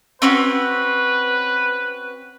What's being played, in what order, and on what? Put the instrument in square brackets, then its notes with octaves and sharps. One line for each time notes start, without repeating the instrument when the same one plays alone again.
[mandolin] C4 C#4 F#4 [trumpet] B4